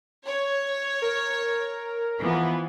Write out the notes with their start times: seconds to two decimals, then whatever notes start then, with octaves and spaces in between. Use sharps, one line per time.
0.24 C#5
1.02 A#4
2.20 E3 F3 B3